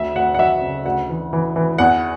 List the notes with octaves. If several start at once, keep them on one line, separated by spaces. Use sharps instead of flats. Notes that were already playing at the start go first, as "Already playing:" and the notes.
Already playing: D2 E5
D2 F#5
F#5
F#3 E5
C#3
D2 F#5
E3
E3
E3
E2 F#5